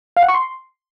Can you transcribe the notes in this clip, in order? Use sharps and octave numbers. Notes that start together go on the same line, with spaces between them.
F5
F#5
C#6
C6